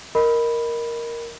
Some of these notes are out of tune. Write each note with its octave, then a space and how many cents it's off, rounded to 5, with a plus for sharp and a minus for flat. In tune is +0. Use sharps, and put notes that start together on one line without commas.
A#4 +0 D#5 +0 B5 +0